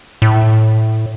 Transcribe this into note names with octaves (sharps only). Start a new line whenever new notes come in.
A2